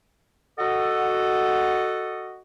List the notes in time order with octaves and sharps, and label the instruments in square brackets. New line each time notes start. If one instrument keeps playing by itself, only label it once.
[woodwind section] F#4 A4 D#5